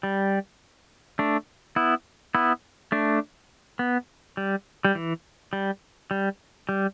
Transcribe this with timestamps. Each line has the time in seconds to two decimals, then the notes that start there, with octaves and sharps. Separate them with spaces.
0.03 G3
1.19 A3 D4
1.76 B3 E4
2.35 B3 E4
2.92 A3 D4
3.79 B3
4.37 G3
4.85 G3
4.95 E3
5.53 G3
6.11 G3
6.69 G3